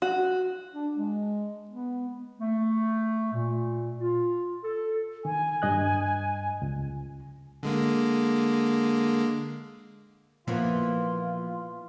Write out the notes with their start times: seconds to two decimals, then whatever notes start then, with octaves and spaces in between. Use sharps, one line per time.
0.02 F#4
0.73 D4
0.96 G#3
1.71 B3
2.41 A3
3.33 A#2
3.99 F4
4.63 A4
5.25 D#3 G#5
5.62 G2 D#5 F#6
6.62 C#2
7.63 D3 G#3 A#3
10.48 A#2 E3 F3 A#3 B3 E4 F4